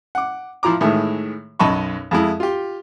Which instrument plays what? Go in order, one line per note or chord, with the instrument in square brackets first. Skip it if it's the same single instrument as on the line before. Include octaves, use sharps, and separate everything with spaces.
[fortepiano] F#5 D6
F3 E4 F4 A#5 D6
A2 D#3 E3 G#3
B1 F#2 D#5 A5 B5 C#6
F2 G#3 E4
F4 G4